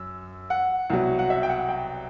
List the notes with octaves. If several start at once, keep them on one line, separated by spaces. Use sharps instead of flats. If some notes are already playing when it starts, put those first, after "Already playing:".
Already playing: F#2 E6
F#5
C2 B2 F#3
F#5
E5
G5
F#5
G5